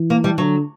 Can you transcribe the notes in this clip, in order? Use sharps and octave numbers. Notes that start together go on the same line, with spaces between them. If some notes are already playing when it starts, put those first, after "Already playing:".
Already playing: E3
A#3
G3
D3 F#3